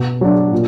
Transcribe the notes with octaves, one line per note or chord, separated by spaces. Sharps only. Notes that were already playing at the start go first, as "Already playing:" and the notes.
Already playing: B2
F#3 D4
A#2